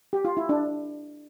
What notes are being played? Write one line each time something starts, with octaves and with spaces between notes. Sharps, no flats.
G4
F4
E4
D4